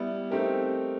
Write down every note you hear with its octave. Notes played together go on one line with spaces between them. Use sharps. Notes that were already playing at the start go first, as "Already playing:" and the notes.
Already playing: G3 B3 E4
A3 C4 D#4 G4 A#4